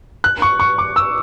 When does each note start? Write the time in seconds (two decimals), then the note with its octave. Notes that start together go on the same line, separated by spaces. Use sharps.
0.24 F#6
0.42 C#6
0.60 C#6
0.78 D6
0.96 E6